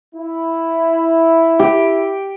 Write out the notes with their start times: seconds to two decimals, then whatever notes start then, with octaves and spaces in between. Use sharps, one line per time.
0.15 E4
1.59 G4